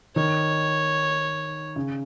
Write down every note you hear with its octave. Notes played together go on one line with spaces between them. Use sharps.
D#3 C#5
C#3